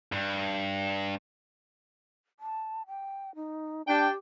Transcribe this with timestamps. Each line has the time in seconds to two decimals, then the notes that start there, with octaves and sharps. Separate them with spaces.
0.12 G2
2.40 A5
2.87 G5
3.35 D#4
3.88 D4 G4 G5